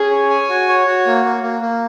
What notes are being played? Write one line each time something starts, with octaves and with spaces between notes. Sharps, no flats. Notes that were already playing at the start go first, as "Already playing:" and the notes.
Already playing: C#4 G#4
C#5
G#5
F#4
C#5
F#4
A#3
A#3
A#3
A#3